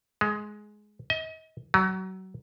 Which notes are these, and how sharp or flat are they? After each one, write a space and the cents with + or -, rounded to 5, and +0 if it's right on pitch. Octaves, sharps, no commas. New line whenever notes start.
G#3 +15
D#5 +40
F#3 +25